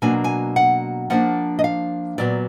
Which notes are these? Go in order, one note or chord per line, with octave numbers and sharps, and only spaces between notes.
B2 F#3 A#3 D4 G#5
G#5
F#5
F3 A#3 D4 F#5
D#5
F5
A#2 F#3 B3 D5